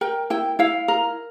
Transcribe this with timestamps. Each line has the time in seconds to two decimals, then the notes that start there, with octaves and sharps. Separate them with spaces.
0.01 A#4 G5
0.30 E4 G5
0.59 E4 F5
0.88 A#4